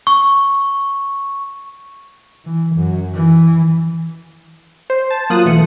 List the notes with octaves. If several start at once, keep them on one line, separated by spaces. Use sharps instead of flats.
C#6
E3
F#2
E3
C5
A5
F#3 A#3 F4 D#6 F#6 D#7
B1 E3 A3 C#7